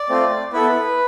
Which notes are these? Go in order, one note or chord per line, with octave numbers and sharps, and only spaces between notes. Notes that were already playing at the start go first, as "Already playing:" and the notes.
Already playing: D5
A3 C4 F4
B3 E4 A4 B4